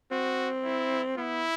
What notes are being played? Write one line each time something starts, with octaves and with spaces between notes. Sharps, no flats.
C4 F#4
E4
B3 E4